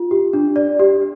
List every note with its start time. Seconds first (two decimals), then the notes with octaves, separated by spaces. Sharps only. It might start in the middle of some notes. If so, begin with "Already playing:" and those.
Already playing: F4
0.11 G4
0.33 D4
0.56 D5
0.80 G4